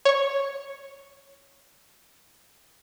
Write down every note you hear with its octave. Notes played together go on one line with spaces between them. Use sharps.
C#5 C#6